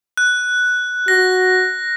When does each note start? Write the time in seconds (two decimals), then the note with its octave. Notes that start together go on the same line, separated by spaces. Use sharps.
0.17 F#6
1.08 F#4 A#6